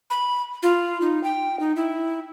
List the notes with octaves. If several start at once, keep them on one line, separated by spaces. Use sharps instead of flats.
B5
F4
D#4
G5
D#4
E4